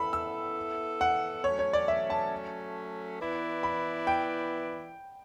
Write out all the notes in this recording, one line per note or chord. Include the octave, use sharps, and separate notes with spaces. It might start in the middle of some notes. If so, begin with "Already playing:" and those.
Already playing: B3 E4 A4 E5 B5
E6
F#5
F#3 A3 C#4 C#5
C#5
D5
E5
A5
E3 B3 E4 B4 D5
B5
G5